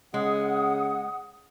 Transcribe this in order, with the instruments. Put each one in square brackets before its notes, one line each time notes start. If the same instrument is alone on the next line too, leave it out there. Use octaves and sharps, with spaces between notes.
[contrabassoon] C#3 [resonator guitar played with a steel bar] G#3 [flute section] F#5 D#6